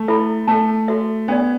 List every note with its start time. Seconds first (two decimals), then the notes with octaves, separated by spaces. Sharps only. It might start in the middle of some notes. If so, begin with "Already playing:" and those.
Already playing: A3
0.08 E4 A4 E5 B5
0.48 A3 A4 E5 A5
0.88 F#4 A4 E5
1.28 B3 D4 G4 D5